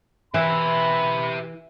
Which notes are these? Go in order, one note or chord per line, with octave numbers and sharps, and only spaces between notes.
E3 G4 E5 B5